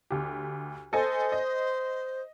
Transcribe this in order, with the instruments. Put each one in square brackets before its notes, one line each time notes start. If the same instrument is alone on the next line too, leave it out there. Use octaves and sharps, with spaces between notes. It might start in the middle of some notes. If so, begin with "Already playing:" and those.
[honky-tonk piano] D2 G4
[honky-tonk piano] A4 D#5 G#5 [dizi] C5
[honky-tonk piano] D#5